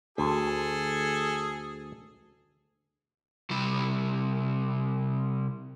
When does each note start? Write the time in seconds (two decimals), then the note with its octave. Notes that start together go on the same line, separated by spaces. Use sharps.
0.18 D2 G#4 A4
3.50 C3 G3 E4